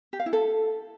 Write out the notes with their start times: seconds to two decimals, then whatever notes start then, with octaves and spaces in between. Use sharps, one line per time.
0.13 G4
0.20 F5
0.26 E4
0.33 A4